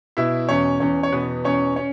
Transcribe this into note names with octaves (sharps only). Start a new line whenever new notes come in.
B2 E4 E5
E2 C#4 C#5
E2 C#4 C#5
C#5
B2 B3 B4
E2 C#4 C#5
C#4 C#5